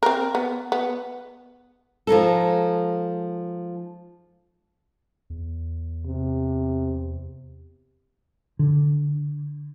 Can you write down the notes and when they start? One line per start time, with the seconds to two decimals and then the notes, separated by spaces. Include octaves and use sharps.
0.03 C4 A#4
0.35 B3
0.72 B3
2.07 F3 G#3 D#4 A4
5.30 E2
6.06 C3
8.59 D3